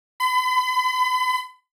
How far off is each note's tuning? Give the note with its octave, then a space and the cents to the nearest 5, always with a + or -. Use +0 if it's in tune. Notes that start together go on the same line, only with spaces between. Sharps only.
B5 +40